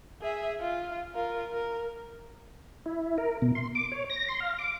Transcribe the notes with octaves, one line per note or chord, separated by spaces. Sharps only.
G#4 E5
F4
F4 A#4
A#4
E4
A#4
B2
C6
D6
C#5
A#6
C6
F5
D6